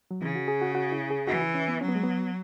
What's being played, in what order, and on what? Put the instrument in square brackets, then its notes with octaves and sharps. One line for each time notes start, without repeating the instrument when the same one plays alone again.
[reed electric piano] F#3
[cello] C#3 [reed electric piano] E3
[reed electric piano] F#4
G#4
F#4
F#4
E4
G#4
[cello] E3 [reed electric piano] F#4
[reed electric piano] E4
C#4
B3
[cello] F#3 [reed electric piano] C#4
[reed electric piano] B3
G#3
B3